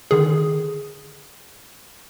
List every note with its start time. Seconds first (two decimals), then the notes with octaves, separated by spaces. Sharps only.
0.11 D3 D#3 G#4